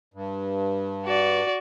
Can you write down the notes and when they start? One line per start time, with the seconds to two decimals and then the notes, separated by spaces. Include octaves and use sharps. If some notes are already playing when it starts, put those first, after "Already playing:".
0.14 G2
1.06 F#4 D5